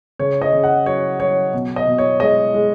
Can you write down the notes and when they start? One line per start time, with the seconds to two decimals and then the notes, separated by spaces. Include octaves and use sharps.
0.19 C#3 C#5
0.42 D#5
0.53 C#3
0.64 F#5
0.86 F#3 C#5
1.20 F#3 C#5
1.53 B2
1.76 D#5
1.87 B2
1.98 C#5
2.20 G#3 D#5
2.54 G#3